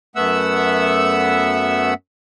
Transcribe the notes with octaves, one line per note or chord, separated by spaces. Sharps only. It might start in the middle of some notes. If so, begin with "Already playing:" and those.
F#2 A3 B3 E5 F#5 E6